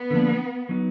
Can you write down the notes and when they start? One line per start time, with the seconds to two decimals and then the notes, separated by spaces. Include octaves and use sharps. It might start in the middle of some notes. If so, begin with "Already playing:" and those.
Already playing: B3
0.10 D3 F3 A#3 D4
0.69 F#3 B3 D#4 F#4